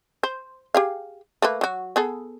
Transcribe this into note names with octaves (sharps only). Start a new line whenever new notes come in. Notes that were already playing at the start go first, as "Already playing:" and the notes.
C5
G4 G#4 F5
A3 A#3 B4
F#3 F#4
B3 G#4 A4